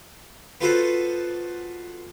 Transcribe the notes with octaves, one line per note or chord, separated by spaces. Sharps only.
B3 F4 F#4 A4 B4 C5